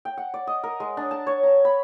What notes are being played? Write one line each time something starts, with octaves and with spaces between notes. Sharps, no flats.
G5
F#5
D5
D#5
A#4
G#3
D4
A5
C#5
A#5
B5